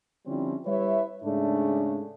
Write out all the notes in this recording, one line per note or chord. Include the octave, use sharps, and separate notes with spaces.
D3 F3 G3 C4 C#4 E4
G3 E4 B4 C#5 E5
G#2 C#3 A3 D4